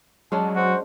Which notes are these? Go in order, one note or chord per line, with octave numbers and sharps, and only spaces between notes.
F#3 G#3 C#4 D4 A5
F#4 C5